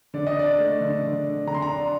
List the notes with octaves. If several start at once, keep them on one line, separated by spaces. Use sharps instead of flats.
D3 D5
D#5
D4 D5
A3
D3
D3
D4
D3 A#5
C6
A#5
D4